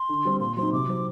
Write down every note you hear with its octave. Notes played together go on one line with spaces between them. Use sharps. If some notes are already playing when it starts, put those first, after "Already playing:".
Already playing: C6
D3
G3 C4
A#2 C6
F#3 C4 D#4 C6
C3 D6
F#3 C4